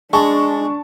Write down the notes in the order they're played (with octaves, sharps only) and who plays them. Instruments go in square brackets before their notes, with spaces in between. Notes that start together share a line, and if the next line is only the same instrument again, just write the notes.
[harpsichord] G#3 [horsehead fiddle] D4 [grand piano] A5 C#6